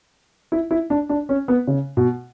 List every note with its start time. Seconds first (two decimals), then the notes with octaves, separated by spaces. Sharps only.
0.52 E4
0.71 E4
0.90 D4
1.09 D4
1.29 C#4
1.48 B3
1.67 C#3
1.97 B2